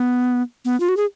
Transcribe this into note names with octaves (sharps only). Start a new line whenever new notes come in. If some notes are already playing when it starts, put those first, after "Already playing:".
Already playing: B3
B3
F4
F#4
G#4